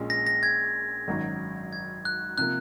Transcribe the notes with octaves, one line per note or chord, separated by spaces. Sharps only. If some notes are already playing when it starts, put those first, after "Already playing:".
Already playing: A#1 A#2 G#3 C#4
A#6
A#6
G#6
G#1 F#2 D#3 F#3
G#6
F#6
C3 F3 A#3 F#6